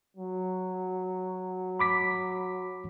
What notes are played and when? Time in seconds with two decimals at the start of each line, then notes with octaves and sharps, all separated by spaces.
0.17 F#3
1.79 B5 D6 B6